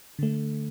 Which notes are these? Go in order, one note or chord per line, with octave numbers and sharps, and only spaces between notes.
D3 A3